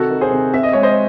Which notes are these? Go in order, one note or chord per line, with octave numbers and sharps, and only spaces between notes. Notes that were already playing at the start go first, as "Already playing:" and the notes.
Already playing: C3 D#3 F#4 A4
D#3
G#4 C5
C3
C4 E5
D#5
G#3 C#5
C5 D#5